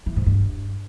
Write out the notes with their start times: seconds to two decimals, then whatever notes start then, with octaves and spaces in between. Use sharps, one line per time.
0.06 E3
0.16 G#2
0.26 G2